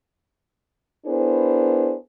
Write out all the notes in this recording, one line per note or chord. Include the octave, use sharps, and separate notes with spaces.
B3 D4 E4 G#4 A#4 C5